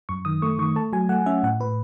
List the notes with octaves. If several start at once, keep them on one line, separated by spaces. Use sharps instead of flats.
F#2 C#6
D#3 D#6
A3 C#6
D#3 C#6
A3 A5
F#3 G#5
A3 F#5
C#4 E5
A2 F#5
A2 B4